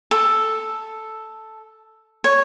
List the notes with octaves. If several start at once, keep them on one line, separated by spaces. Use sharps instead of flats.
A4
C#5